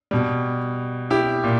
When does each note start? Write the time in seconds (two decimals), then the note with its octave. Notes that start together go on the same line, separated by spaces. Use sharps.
0.11 B2 G3
1.10 E4 G4
1.44 A#2